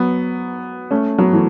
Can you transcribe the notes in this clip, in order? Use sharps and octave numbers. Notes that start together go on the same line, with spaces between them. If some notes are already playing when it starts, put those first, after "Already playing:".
Already playing: F#3 B3
A3 C#4
F#3 B3
E3 A3